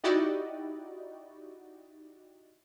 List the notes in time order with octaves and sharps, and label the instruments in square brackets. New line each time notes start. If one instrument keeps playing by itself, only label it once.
[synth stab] D#4 E4 F#4 G4 D5 D#5